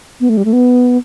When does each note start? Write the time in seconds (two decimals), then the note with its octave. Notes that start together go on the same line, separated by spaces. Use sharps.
0.20 B3
0.29 A3
0.37 G3
0.45 A3
0.53 B3